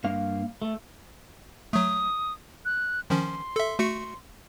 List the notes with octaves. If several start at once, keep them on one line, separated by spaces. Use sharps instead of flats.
G2 A#3 F5
A3
F#3 A3 D#6
F#6
D#3 F3 C#4 C6
A4 E5
A3 F#4 C#7